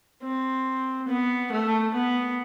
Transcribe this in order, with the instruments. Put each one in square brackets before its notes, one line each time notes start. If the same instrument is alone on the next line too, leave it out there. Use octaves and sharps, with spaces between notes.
[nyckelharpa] C4
B3
A3
B3